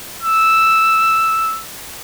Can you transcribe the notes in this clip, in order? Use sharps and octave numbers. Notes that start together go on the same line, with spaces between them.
E6